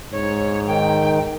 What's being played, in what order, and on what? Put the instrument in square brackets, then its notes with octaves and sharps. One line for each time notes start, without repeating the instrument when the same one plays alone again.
[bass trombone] G#2 [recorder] C#5
[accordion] D#3 [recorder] G5